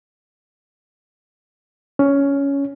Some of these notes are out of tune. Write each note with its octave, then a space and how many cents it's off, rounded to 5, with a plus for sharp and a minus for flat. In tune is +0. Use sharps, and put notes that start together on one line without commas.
C#4 +10